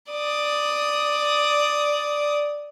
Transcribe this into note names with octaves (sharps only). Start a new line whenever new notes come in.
D5 D#6